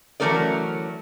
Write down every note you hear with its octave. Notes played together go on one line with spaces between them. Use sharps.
E3 F#3 A3 C#4 A#4 D5